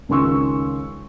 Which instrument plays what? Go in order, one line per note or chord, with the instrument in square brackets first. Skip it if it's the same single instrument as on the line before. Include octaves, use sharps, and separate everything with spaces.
[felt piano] C#2 D#3 C#4 C6 C#6 E6